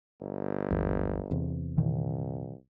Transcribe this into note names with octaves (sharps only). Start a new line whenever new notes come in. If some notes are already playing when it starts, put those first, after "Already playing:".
G1
G#1 E2
E2 C3
C2 A#2 D#3 E3